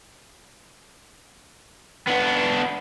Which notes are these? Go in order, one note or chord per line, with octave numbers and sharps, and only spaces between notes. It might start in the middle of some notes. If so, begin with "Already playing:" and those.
B3 D4